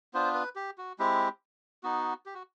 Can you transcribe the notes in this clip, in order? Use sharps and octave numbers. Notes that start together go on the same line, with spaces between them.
B3 D4 F4 C5
B4
G4
F#4
G#3 C4 E4 G4
B3 D#4 F#4
G4
F#4